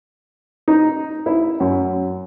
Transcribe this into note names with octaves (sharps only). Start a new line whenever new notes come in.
D#4
E4
F#2